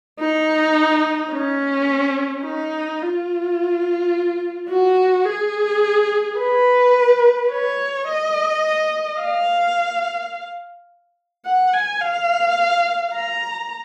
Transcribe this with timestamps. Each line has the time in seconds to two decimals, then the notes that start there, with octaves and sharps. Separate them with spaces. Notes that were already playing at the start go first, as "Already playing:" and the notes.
0.20 D#4
1.33 C#4
2.44 D#4
3.01 F4
4.69 F#4
5.26 G#4
6.38 B4
7.51 C#5
8.07 D#5
9.20 F5
11.45 F#5
11.73 G#5
12.01 F5
13.14 A#5